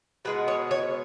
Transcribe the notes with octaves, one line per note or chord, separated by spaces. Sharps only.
B2 G#3 B3 B4
C#5
C#5